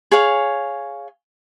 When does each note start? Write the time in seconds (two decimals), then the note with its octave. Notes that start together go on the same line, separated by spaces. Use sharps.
0.12 G#4 C#5 F5 G#5